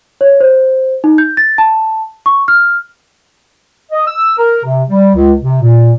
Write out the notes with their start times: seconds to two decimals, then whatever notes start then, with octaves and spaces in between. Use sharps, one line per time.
0.21 C#5
0.41 C5
1.04 D#4
1.18 G6
1.37 A6
1.58 A5
2.26 C#6
2.48 F6
3.92 D#5
4.07 E6
4.38 A#4
4.65 C3
4.90 G3
5.15 C#2
5.42 C3
5.62 A#2